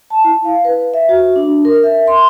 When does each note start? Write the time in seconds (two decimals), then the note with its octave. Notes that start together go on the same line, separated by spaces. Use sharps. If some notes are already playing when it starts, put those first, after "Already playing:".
0.10 A5
0.24 E4
0.45 F5
0.65 B4
0.94 E5
1.09 F#4
1.36 D4
1.65 A#4
1.83 E5
2.07 C6